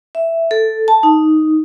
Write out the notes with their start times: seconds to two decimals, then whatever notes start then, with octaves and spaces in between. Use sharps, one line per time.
0.15 E5
0.51 A4
0.88 A5
1.03 D#4